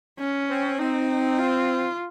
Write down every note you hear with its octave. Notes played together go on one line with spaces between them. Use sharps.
C#4
C4
C4 D#4
F4